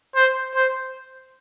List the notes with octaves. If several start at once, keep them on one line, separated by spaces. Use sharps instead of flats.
C5
C5